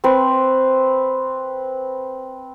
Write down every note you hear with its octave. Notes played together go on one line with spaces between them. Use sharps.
C4 B4 C#6